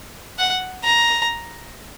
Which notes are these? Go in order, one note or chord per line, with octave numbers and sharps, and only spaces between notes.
F#5
A#5